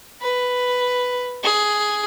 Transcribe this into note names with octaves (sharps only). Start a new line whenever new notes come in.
B4
G#4